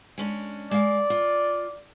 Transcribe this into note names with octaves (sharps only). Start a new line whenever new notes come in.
G#3 C#4 D4
G#3 D5 F5
F4